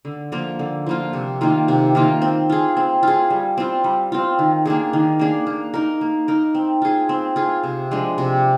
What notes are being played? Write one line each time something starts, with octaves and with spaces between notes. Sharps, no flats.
D3
F3 A#3 F4
D3
F3 A#3 F4
C3
D#3 A#3 F4
C3
D#3 A#3 F4
C4
F4 G#4
C4
F4 G#4
G3
C4 F4
G3
C4 F4
D#3
A#3 D4 G#4
D#3
A#3 D4 G#4
A#3
D#4 A#4
A#3
D#4 A#4
C4
F4 G#4
C4
F4 G#4
C3
F3 G#3 D4
C3